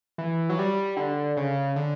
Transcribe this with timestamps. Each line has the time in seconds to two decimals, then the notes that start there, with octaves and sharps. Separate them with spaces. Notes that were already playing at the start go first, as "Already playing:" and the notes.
0.18 E3
0.50 F#3
0.59 G3
0.97 D3
1.37 C#3
1.76 D3